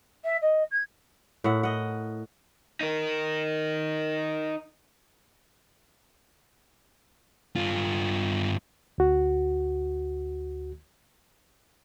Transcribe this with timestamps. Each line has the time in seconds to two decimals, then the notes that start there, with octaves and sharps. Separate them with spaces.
0.24 E5
0.41 D#5
0.71 G#6
1.44 A2 A#4 E5 F#5
1.63 D#5 F#5
2.81 D#4 A#4
7.56 G2 F4
8.98 D2 F#4